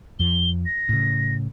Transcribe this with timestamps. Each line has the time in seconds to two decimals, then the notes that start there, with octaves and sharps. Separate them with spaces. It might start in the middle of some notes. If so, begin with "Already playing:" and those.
0.19 F2 F3 G7
0.66 A#6
0.89 A2 C#3